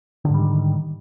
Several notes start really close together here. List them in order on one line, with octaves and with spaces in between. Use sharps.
D3 G#2 G3 D#3